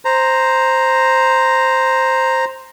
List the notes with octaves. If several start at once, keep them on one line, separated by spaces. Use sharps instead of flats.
C5 A#5